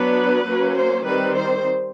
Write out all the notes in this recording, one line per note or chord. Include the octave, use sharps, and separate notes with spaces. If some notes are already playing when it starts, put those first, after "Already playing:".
Already playing: F#3 B3 D4 B4
F#3 A#3 C#4
C5
D#3 G3 C4 B4
C5